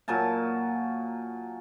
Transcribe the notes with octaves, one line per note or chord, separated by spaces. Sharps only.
A#2 F#3 G#5 A5